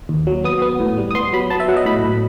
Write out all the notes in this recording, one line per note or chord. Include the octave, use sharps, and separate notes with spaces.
D#2
F#3
B3 D#6
B3
A2
G3
D#6
B3 C6
F#3 B5
B3 A5
E5
F#3 F#5
D#5
A2 B5
A2